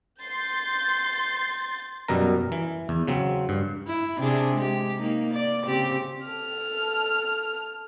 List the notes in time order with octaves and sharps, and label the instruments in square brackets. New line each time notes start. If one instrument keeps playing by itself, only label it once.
[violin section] C6 G6 A6
[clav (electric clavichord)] F#2 B2 G3 A#4 A#5
E3
E2
C#3 F#3 C4
G2
[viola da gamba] E4
C3 D4 G#4
G#3 G4
A#3 D#4
D5
C#3 C4 G4
[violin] A4 F6